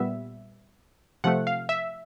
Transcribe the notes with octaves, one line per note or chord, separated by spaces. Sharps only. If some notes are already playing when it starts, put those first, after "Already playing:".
Already playing: A#2 G3 B3 E5
C3 F3 A3 F#5
F5
E5